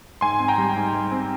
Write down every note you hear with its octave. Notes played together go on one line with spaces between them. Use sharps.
G#2 G#5 C6
C4
G5 A#5
G3
G#2
G#2
C4